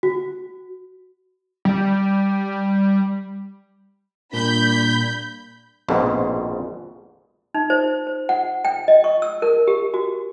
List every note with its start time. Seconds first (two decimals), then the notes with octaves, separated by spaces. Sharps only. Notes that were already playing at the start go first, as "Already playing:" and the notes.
0.03 F#4
1.65 G3
4.33 A#2 G3 D4 B5 G6
5.89 A#1 F2 G#2 B2
7.54 D#4
7.70 C5
8.07 C5
8.29 F#5
8.65 G5
8.88 D#5
9.04 C#6
9.22 E6
9.42 A#4
9.68 G4
9.94 F#4